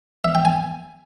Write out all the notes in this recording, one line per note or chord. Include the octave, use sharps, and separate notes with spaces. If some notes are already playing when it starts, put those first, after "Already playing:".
E5
G5
G#5